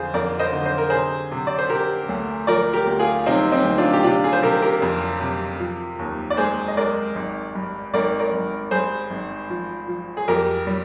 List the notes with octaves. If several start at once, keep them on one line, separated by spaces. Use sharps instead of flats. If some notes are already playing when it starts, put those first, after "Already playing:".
Already playing: F2 D3 F4 G#4 C5
F2 A#4 D5
C5 D#5
D3
C5
A#4
C3 G#4 C5
C3
D5
C5
C3 G4 A#4
D2
F3 A#4 D5
G4 A#4
D2
F4 G#4
C3 C4 D#4
C4 D#4
D2
D4 F4
G4
C3 D4 F4
F4 G#4
C5
C3 G4 A#4
G4 A#4
F2
C3
F3
D#2
D5
G#3 G#4 C5
D#5
G#3 A#4 D5
G#1
G2
G#1 A#4 D5
A#4 D5
G#1
G2 G#4 C5
G#1
F3
F3
G#4
F2 G4 A#4
G3